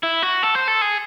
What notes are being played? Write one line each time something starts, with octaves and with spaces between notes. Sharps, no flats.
E4
F#4
A4
C5
A4
G#4